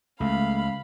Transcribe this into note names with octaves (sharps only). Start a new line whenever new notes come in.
C#2 A3 F5 B5